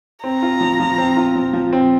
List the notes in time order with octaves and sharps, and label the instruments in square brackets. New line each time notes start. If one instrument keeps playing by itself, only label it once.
[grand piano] C4 [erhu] A#5
[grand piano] F4
F3
F3
C4
F4
F3
F3
C4